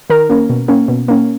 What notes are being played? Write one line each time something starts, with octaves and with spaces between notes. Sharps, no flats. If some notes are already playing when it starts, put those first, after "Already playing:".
D#3 A#4
A#3 C#4
B2
A#3 C#4
B2
A#3 C#4